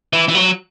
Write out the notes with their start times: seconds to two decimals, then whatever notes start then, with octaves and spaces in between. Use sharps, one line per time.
0.13 E3
0.28 E3
0.35 F#3